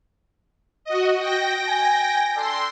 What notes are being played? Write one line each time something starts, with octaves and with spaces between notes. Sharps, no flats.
F#4 D#5
G5 A#6
G#5
D4 A4 C6